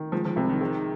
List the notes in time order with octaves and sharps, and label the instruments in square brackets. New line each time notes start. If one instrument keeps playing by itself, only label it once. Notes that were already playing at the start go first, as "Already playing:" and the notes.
Already playing: [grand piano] D#3
[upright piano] F3 [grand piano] G#3
[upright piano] F3
[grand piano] C2 [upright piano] C3
[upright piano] D#3
[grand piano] D#3 [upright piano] G#3